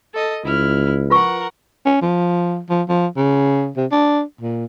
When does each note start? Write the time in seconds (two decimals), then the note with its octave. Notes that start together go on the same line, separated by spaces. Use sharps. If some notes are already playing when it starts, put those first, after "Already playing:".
0.14 A4 D#5
0.45 C#2 E4 F6
1.10 F4 A#4 B4 F#5 C#6
1.86 C#4
2.02 F3
2.69 F3
2.89 F3
3.17 C#3
3.77 C3
3.91 D4
4.41 A#2